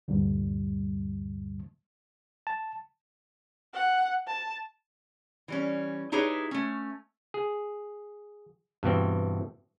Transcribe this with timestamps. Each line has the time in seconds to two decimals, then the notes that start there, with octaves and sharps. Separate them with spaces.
0.08 D2 G2 A#2 D3 G3
2.47 A5
3.74 F#5
4.27 A5
5.48 E3 G3 C#4
6.12 D#4 E4 G4 G#4 B4 C#5
6.51 A3 C#4
7.34 G#4
8.83 G2 B2 E3 C4